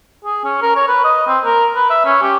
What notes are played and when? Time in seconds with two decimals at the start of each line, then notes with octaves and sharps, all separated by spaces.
0.25 G#4
0.45 C#4
0.62 A#4
0.76 C#5
0.88 B4
1.04 D#5
1.27 C4
1.45 A#4
1.76 B4
1.90 E5
2.05 C#4
2.22 G4